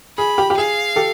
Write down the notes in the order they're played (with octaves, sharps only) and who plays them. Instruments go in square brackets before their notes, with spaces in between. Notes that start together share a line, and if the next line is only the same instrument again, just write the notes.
[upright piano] G#4 [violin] B5
[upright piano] G4
G4
[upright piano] G#4 [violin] F5
[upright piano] G4 A4